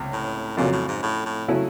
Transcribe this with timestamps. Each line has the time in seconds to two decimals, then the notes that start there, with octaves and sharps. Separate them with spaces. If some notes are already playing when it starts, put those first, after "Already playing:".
Already playing: C#2 C3
0.13 A2
0.57 F2 A#2 C#3 F#3
0.72 A2
0.88 G#2
1.03 A2
1.25 A2
1.48 C#3 F#3 A3 C#4 E4